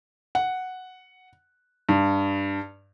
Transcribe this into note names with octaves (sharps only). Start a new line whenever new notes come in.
F#5
G2